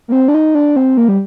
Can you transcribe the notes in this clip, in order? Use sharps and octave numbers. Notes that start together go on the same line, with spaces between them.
A#3
C4
D4
D#4
D4
C4
A#3
G3